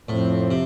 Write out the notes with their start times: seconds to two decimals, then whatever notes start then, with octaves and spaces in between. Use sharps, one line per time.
0.09 F2 A2 F3 C4
0.51 C3